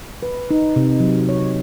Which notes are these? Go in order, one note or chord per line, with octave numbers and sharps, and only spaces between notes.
B4
D#4
C3
F#3
C#5